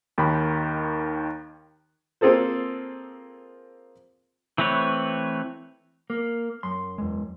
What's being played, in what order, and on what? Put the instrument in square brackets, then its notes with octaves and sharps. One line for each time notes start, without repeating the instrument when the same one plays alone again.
[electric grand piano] D#2 D#3 B5
[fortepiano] A#3 C4 F4 G#4 A4 C5
[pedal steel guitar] E3 A3 C4 B4 C#5
[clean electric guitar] A#3
F#2 C6
[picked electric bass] E2 G#3